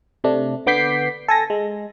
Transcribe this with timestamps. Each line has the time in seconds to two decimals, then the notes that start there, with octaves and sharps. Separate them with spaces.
0.24 C3 A3 D4
0.66 D3 B3 D6 G6 B6 C7
1.28 A4 G#5 A#6
1.50 G#3